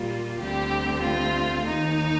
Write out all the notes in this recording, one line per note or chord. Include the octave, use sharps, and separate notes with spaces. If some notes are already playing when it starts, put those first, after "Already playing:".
Already playing: A#2 G3 A#3 F4
D2 D3 G3 C4 G4
F4
D#2 D#3 A#3 D#4